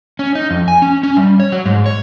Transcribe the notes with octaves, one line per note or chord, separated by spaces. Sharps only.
C#4
D#4
F2
G#5
C#4
C#4
G3
C#5
F#3
G#2
C#5